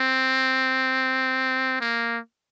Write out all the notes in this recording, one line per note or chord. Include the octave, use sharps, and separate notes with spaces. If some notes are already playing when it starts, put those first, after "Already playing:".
Already playing: C4
A#3